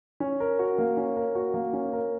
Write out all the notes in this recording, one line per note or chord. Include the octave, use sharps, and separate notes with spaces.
C#4
A#4
F#4
A#3
C#4
A#4
F#4
A#3
C#4
A#4